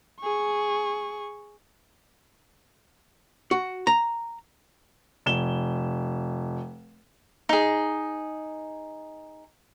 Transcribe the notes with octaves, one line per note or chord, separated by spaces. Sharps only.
G#4 C#6
F#4
A#5
F1 E7 G7
D#4 G#4